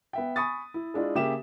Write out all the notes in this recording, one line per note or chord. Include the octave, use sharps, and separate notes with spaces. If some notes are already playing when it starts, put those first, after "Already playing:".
B3 E5 G5
G#5 B5 C#6 D#6 A6
E4
G#3 D4 E4 F4
C#3 A#3 C#4 G4 E5 E7